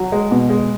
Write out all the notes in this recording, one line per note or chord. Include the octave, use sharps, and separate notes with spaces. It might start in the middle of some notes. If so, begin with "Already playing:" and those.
Already playing: F#3
G#3
B2
G#3